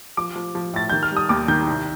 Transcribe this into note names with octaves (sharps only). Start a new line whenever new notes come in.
F3 D6
F3
F3
A2 A6
D#3 G6
F6
G3
D#6
D#2 D6
D#3 G6
C2